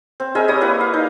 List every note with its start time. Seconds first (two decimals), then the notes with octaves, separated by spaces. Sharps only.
0.20 C4
0.35 G#4 A#4 D#5 E5
0.48 G3 C#5 D#6
0.61 A#3 E4 B4
0.81 F5
0.94 D#4